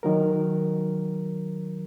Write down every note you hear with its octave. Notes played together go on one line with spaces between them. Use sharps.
D#3 F#3 A#4